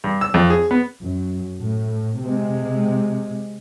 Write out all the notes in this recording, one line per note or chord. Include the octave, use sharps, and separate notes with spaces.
G2
E6
F2
G#4
B3
F#2
A2
C3 G#3